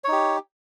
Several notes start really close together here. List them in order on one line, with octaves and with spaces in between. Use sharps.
C#5 D#4 G4